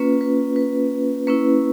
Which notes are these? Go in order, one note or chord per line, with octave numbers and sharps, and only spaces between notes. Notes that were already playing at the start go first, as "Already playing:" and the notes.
Already playing: A#3 C#4 F4 B4
B4
B4
A#3 C#4 E4 B4